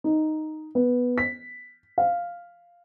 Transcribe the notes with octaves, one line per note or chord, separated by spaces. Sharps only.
D#4
B3
B6
F5